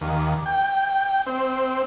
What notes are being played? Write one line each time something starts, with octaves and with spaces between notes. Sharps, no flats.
D#2
G5
C4